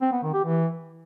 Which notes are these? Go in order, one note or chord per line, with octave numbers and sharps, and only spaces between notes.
C4
B3
D#3
G4
E3